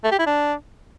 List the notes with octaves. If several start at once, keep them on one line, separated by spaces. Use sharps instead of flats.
A3
G4
E4
D4